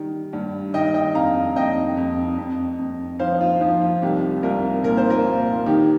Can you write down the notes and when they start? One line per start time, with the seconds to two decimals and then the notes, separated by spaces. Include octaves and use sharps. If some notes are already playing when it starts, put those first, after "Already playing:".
Already playing: D#3 G3
0.33 G2
0.74 D#3 D#5 G5
0.94 D#5 G5
1.15 F2 F5 A#5
1.56 F2 D#5 G5
1.97 F2
2.38 F2
2.79 F2
3.19 F3 C5 F5
3.32 D#4
3.41 F4
3.61 F3 D#4
3.82 F4
4.02 C2 D#4 G4
4.43 C2 F4 A#4
4.84 A#2 A#4
4.97 C5
5.10 F4 A#4
5.25 A#2
5.66 D#3 D#4 G4